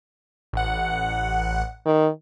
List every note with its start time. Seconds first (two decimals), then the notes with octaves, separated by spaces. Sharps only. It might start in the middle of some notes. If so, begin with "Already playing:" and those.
0.53 A1 F#5
1.86 D#3